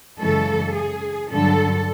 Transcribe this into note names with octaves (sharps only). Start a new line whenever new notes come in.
F#2 C#3 E3 G#3 A4
G#4
G2 D3 F#3 A4